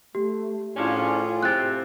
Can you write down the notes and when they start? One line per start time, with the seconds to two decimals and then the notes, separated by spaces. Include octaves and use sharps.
0.15 A3 G4
0.76 A2 F3 C#4 D4 E4 F4 G#4
1.43 C3 C4 F#6 A6